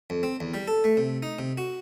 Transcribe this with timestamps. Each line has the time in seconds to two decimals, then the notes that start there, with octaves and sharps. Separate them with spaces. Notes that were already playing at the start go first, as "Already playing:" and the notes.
0.10 F2
0.23 C4
0.40 E2
0.54 G3
0.68 A4
0.84 A3
0.97 C3
1.23 D#4
1.39 C3
1.58 F#4